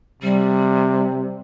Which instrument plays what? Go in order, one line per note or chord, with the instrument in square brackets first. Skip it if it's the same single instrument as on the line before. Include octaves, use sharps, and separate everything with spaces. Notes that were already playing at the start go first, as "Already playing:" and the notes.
[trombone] C3 [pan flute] G3